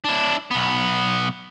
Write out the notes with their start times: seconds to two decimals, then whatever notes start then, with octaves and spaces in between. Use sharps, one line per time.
0.04 D4 E4
0.51 B1 B3